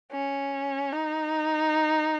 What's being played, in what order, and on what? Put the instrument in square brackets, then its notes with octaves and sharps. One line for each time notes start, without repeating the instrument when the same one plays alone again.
[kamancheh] C#4
D#4